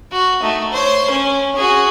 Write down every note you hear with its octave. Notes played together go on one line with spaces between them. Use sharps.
F#4
A3 D#4
C5 C#5
C#4
F#4 G#4